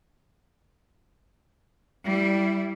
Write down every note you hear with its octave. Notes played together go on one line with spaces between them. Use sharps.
G3 E4